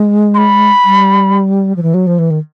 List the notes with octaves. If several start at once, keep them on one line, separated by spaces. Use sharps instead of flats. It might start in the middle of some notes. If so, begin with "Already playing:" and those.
Already playing: G#3
C6
B5
G3
F3
E3
F#3
F3
E3
D#3